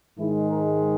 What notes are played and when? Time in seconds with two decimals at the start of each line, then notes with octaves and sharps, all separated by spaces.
0.18 G#2 D#3 G#3 E4
0.50 A#4